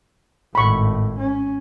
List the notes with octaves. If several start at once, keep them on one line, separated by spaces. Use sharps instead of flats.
G#1 A2 B5 C#6
C#4